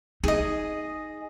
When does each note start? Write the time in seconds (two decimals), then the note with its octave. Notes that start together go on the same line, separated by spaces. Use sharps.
0.24 D#4 G#4 D#5